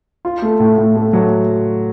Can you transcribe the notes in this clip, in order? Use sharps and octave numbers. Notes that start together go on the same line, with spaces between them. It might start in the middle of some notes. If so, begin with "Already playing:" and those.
F4
A3
A2
A2
A3
F#3